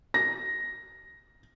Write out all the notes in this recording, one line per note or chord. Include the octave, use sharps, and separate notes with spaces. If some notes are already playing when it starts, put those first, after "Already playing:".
A#6